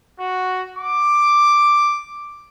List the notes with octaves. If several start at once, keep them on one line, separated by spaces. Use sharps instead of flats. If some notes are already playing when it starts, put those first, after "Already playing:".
F#4
D6